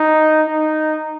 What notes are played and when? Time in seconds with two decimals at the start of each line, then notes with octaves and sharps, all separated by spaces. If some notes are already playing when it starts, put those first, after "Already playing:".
Already playing: D#4
0.47 D#4